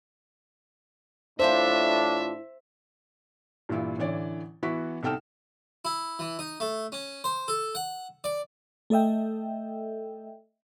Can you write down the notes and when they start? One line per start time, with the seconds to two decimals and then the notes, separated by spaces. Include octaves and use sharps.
1.40 A2 E3 D4 F4 G4 C5 E5
3.69 G2 A#2 E3 E4 F4
3.98 A1 D3 E3 C#5 D5
4.63 E3 B3 E4 F#4 C#6 B6
5.03 C2 D#4 A4 G5 F6 E7
5.85 E4
6.19 E3
6.39 D#4
6.60 A3
6.92 C#4
7.24 C5
7.48 A4
7.75 F#5
8.24 D5
8.90 A3 A4 D#5 E5 G5